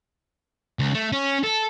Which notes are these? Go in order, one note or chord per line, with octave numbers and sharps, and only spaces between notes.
C#2
A3
C#4
A4